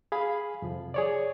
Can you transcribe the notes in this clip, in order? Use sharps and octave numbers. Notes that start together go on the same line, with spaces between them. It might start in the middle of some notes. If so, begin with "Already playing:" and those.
G#4 F5 B5
F2 C3 F3
G#4 C#5 D5